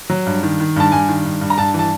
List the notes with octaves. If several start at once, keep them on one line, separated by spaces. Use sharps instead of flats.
F#3
G2
D#3
D#3
G2 A5
G2 G#5
D#3
G2
G2
A#5
G2 A5
E3
A5